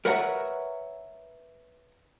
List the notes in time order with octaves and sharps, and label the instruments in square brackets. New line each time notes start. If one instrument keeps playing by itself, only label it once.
[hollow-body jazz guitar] A#4 B4 C#5 E5 F#5 A#5